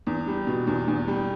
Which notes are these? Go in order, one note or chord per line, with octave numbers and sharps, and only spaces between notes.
E2
G3
B2
E2
E2
G3